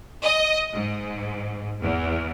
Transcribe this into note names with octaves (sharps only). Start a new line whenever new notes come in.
D#5
G#2
E2